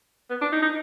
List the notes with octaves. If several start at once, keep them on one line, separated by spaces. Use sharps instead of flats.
B3
D4
D#4
D#4